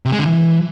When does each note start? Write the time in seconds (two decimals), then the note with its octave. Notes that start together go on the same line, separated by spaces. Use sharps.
0.06 C3
0.12 G#3
0.19 D3
0.26 E3